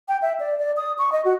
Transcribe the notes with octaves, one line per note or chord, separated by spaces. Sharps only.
G5
E5
D5
D5
D#6
C#6
D#5
F#4